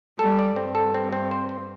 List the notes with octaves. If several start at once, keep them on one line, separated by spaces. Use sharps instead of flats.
G3 A4
D5
G2 C4
A4
C4
C4
C5
C5